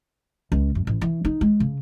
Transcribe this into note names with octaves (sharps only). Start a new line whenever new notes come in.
C#2
F#2
A1
E3
D#4
G#3
C#3